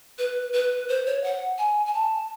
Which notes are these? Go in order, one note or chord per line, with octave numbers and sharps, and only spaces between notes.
B4
B4
C5
C#5
F#5
G#5
G#5
A5